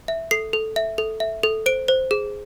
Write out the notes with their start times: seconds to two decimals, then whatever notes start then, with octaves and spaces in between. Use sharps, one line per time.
0.08 E5
0.31 A4 C7
0.53 A4
0.76 E5
0.98 A4
1.20 E5
1.43 A4
1.66 C5 D7
1.88 C5
2.11 G#4